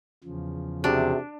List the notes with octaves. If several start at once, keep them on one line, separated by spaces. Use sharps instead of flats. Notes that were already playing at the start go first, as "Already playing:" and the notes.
E2 C#3 F3
C3 D4 F#4 G#4 E5